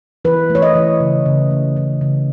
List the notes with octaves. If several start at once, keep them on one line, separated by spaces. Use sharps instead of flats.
E3 B4
A3
C#5
D#5
E3
C#3
C#3
A3
E3
C#3